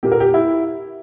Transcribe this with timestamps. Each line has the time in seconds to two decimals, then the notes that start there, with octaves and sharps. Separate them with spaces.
0.03 A#2 A#3 G4
0.12 A#4
0.20 G4
0.34 E4